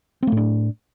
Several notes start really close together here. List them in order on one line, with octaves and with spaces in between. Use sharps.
C4 A3 A2 D4